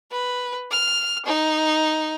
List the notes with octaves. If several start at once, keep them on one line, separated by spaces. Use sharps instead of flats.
B4
F6
D#4